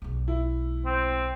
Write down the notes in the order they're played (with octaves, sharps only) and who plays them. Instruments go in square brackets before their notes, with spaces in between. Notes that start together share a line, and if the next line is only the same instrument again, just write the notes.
[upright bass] B1 G#3
[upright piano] E4
[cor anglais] C4